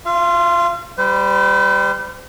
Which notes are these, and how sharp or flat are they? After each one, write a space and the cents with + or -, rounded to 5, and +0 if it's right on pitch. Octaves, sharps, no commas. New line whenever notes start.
F4 +0 F5 -40
G3 +0 C5 -40